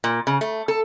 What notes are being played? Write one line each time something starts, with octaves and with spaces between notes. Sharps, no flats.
A#2
C#3
A3
A4